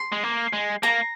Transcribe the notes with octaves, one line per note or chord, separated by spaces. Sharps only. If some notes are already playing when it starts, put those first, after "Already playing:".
Already playing: C6
G#3
A#3
G#3
A#3 A#5